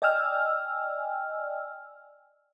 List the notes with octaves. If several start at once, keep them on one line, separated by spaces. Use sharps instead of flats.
D5 D#5 G5 G#5 E6 F6